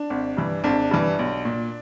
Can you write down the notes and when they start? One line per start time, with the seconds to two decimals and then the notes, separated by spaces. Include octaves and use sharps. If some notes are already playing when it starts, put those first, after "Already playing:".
Already playing: D4
0.10 G#1
0.37 G2 E3
0.64 G#1 D4
0.91 G2 E3
1.19 B1
1.45 A#2